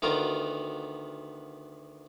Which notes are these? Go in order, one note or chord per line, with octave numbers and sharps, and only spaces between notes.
D2 D#3 B3 F4 F#4 A#4